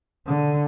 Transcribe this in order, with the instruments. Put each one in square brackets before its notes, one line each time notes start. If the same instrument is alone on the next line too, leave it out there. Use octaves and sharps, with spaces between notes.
[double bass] D3